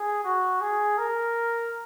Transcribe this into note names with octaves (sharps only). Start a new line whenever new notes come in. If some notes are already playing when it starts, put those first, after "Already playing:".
Already playing: G#4
F#4
G#4
A#4